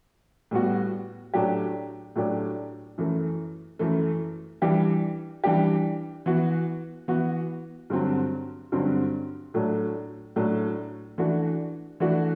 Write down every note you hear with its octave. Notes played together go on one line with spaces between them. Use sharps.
A2 G3 B3 F#4
A2 F#3 A3 D4 G4
A2 F#3 A3 D4 G4
F#2 E3 A3
F#2 E3 A3
E3 G3 D4 G4
E3 G3 D4 G4
E3 B3 F#4
E3 B3 F#4
G2 D3 F#3 C4
G2 D3 F#3 C4
A2 F#3 A3 D4
A2 F#3 A3 D4
E3 A3 D4 F#4
E3 A3 D4 F#4